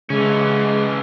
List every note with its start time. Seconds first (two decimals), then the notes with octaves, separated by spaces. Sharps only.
0.10 C#3 E3 G#3 C#4